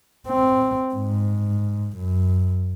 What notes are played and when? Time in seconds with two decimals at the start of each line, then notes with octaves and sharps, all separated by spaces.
0.28 C4
0.94 G#2
1.97 F#2